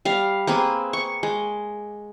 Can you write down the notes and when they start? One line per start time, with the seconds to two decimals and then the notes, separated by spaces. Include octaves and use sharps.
0.05 G3 F5
0.47 A#3 C4 G#4 B4
0.93 C#6
1.23 G#3